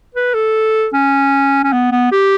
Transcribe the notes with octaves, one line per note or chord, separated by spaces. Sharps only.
B4
A4
C#4
C#4
B3
B3
G4